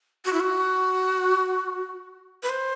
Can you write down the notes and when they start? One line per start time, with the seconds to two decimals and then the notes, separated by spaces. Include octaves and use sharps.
0.25 F#4
0.33 E4
0.40 F#4
2.43 B4
2.49 C5